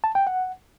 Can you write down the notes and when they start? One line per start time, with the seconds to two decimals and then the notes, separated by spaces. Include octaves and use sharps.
0.04 A5
0.15 G5
0.27 F#5